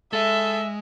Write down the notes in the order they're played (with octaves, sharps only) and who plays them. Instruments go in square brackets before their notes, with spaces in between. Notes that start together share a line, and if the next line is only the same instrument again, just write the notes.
[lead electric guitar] G#3 [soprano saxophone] A4 [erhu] E5